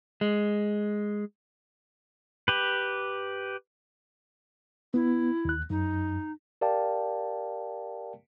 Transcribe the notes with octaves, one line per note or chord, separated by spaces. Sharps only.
G#3
G4 B4
B3 E4
D#2 F#6
F#2 D#4
G4 A#4 D5 F5 G5 A5